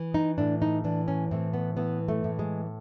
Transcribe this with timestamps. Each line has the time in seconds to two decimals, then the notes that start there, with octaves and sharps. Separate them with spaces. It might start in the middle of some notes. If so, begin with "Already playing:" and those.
Already playing: E3
0.14 D#4
0.38 A2 D4
0.62 D#4
0.84 E3 D4
1.08 C#4
1.31 A2 C4
1.53 B3
1.77 E3 B3
2.08 A3
2.24 A2
2.39 G#3